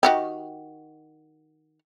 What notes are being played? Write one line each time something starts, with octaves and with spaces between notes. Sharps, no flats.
D#3 F#4 G4